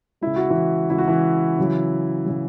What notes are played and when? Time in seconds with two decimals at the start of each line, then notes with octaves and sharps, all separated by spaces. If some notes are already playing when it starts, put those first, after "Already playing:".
0.21 C#3 G#3 E4
0.36 F#4
0.50 E3 E4
0.89 C#3 G#3 E4
0.98 F#4
1.08 E3 E4
1.58 C#3 F#3
2.26 C#3 F#3